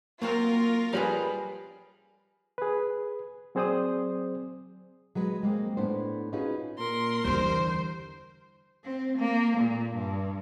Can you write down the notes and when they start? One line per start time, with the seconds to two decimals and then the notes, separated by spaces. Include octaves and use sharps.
0.22 F#3 A#3 C4 F4 A#4 F5
0.93 F3 G3 G#4 B4 F5 B5
2.58 G#4 B4
3.55 F#3 C4 G#4 C5 D5 D#6
5.15 F#3 G#3 B4
5.43 G#3 A#3 C4
5.77 A2 B3 D4 C5
6.33 C#4 D#4 F4 F#4 G#4 B4
6.78 A#2 A#4 C6
7.24 E2 D3 G3 C5
8.84 C4
9.18 A#3
9.58 A#2
9.95 G2